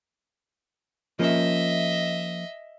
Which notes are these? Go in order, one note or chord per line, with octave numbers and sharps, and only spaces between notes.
F3 A#3 C#4 D#5 E5